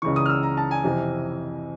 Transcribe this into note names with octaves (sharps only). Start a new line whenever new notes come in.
C#2 C#3 E3 C#6
D#6
F6
E6
A#5
A5
G#5
F2 C3 E3